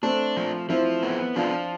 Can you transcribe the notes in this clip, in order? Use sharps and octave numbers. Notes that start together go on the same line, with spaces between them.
A3 C4 D4
F3
F3 C4 E4
B3
F3 D4 F4